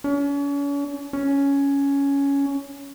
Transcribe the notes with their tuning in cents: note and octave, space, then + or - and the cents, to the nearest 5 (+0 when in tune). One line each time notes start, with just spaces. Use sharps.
C#4 +40
C#4 +10